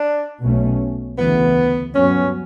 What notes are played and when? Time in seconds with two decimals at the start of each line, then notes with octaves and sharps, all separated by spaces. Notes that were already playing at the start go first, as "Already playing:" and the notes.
Already playing: D4
0.43 B1 B2 A3 C#4
1.19 D2 C#3 E3 B3
1.95 G2 F#3 B3 C#4